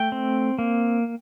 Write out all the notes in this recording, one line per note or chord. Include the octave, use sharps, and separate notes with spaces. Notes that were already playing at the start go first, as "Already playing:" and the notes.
Already playing: A3 G5
C4
A#3